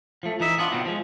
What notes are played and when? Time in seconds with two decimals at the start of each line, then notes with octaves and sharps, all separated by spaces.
0.23 F3 A3
0.40 E3 D#4 E5
0.58 E3 B3 D4 F4
0.72 B2 D#3 F#3 B3 C4
0.86 F3 G#3